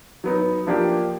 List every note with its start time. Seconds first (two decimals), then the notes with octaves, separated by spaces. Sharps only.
0.24 F#3 B3 D#4
0.66 F3 A#3 D4 G4